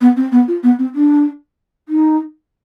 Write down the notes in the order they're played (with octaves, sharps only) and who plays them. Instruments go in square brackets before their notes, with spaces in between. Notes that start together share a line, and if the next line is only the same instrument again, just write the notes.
[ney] B3
C4
B3
F4
B3
C4
D4
D#4